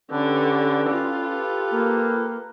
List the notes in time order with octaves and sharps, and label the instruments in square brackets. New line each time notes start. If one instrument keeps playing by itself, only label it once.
[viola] D3 [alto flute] C#4 [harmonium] G4 A4 B4
[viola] F4
[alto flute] A#3